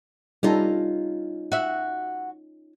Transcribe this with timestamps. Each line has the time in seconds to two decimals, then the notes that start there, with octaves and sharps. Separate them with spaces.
0.43 G3 C#4 D#4 F4 A4 A#5
1.52 F#4 E5